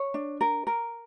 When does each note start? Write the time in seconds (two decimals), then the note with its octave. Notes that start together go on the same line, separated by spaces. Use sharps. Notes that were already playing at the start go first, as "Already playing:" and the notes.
Already playing: C#5
0.14 D4
0.41 A#4
0.67 A#4